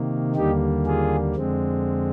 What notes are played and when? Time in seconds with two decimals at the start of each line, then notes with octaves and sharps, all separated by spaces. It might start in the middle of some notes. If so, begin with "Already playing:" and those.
Already playing: C3 D#3 A#3
0.35 D#2 D3 G3 A#3 D#4 G4
0.86 F4 G#4
1.35 F2 D3 G#3 C4